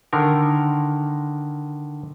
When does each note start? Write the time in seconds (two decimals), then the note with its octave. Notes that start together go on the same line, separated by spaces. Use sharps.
0.13 D3 D#3 A#4